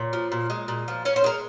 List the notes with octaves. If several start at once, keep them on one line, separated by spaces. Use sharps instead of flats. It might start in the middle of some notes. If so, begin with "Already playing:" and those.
Already playing: A#2 C#5
F3
A#2
G#3
A#2
F3
C#4 C#5
C5
G#3 A#4